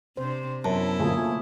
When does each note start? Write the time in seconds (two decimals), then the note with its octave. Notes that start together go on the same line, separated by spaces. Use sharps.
0.17 C3 D4 C5
0.65 F#2 B3 E4 A5
1.00 D2 A#2 A3 A#3 G#4 A5